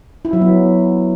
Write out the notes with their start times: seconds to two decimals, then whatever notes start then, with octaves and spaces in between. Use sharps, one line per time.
0.25 E4
0.33 F#3
0.41 B3